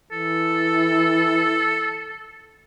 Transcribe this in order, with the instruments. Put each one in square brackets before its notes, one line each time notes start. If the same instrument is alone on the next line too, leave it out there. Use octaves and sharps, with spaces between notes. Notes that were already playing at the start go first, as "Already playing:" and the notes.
[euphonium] E3 [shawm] A4